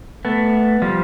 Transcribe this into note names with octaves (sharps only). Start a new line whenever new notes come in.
A3 B3
F3 G3